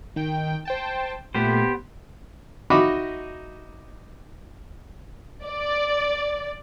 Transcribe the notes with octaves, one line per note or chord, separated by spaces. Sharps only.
D#3 G5
C5 G5 A5
A#2 A3 B3 G4 C5
D#4 F#4 D#5 E5 B5 D6
D5